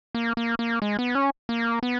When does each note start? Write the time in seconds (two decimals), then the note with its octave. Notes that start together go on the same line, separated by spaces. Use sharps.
0.15 A#3
0.37 A#3
0.59 A#3
0.82 G#3
0.99 B3
1.15 C#4
1.49 A#3
1.83 B3